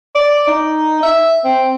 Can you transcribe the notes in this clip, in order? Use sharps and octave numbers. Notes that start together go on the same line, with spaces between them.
D5
D#4
E5
C4